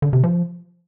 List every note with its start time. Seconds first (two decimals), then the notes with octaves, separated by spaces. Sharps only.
0.02 D3
0.13 C3
0.23 F3